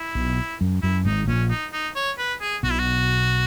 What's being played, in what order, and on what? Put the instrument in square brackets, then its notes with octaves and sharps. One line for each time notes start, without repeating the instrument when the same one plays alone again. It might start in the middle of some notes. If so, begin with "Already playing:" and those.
Already playing: [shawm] E4
[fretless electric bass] B1 B2
F#2
[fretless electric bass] F#2 [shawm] E4
[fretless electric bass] G#1 G#2 [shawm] D#4
[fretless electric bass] A#1 A#2 [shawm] C#4
[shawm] D#4
D#4
C#5
B4
G#4
[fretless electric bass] B1 B2 [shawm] F#4
[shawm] E4
F#4